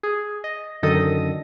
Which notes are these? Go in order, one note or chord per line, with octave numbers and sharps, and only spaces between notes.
G#4
D#5
F#2 D3 D#3 A4 D#5 D#6